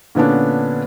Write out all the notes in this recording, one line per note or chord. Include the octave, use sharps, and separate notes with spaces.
A#2 D3 B3 C#4 D4